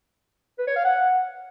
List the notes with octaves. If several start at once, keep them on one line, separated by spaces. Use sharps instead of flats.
B4
C#5
F5
F#5